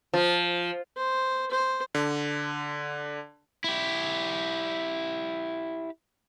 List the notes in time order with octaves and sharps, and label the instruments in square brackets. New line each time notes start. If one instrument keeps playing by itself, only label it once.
[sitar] F3
[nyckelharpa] C5
C5
[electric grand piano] D3
[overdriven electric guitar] E4 G4